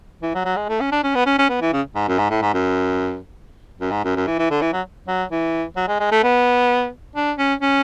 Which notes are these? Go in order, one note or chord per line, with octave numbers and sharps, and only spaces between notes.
E3
F#3
F#3
G#3
A3
C#4
D4
C#4
B3
C#4
C#4
B3
E3
C#3
G#2
F#2
G#2
A2
G#2
F#2
F#2
G#2
F#2
F#2
E3
E3
D3
E3
F#3
F#3
E3
F#3
G#3
G#3
A3
B3
D4
C#4
C#4